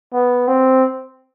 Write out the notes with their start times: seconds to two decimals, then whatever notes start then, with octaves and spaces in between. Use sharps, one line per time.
0.13 B3
0.48 C4